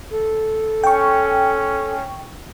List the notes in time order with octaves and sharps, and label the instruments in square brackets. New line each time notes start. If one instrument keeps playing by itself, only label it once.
[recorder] A4
[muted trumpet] C#4 [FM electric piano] G5 C#6